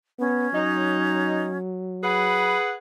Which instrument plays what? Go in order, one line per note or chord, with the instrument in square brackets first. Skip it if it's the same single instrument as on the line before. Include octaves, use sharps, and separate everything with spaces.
[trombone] B3 [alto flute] C#4
[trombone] F#3 [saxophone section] D#4
[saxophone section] G#4 B4 F#5 [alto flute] B5